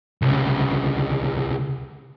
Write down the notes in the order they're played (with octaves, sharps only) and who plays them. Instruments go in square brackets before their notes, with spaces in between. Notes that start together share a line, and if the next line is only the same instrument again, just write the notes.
[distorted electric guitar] C2 C#3